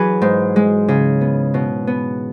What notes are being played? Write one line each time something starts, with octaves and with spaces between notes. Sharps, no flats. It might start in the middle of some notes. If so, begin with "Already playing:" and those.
Already playing: E3 F#3 E4 G#4 B4
G#2
G#3
C#3
B3
B2
B3